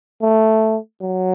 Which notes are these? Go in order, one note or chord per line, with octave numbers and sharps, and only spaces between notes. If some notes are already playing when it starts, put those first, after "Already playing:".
A3
F#3